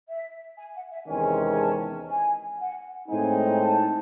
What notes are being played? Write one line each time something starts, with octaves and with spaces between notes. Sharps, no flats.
E5
G#5
F#5
E5
E2 C3 D#3 G#3 C#4 G#5
A5
G#5
F#5
A2 G#3 C4 D#4 G#5
A5